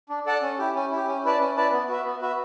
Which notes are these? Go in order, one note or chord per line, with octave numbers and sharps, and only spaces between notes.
D4
A4 D5 F#5 A5
C#4
E4 G4
C#4
E4
G4
C#4
E4 B4 D5 A5
C#4
E4 B4 D5 A5
B3
F#4 B4 E5
B3
F#4 B4 E5